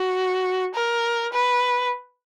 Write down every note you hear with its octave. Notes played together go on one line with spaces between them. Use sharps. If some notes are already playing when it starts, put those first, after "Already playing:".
Already playing: F#4
A#4
B4